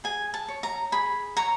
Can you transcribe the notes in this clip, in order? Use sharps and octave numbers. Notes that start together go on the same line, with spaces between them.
G#4 G#5
A5
C#5
A#5
G#4 B5
C#5 A#5